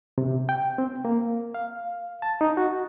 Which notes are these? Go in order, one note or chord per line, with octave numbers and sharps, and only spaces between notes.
C3
G5
C4
A#3
F5
A5
D#4
F#4